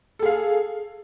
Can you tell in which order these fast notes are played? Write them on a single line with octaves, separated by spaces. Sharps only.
A4 G#4 F5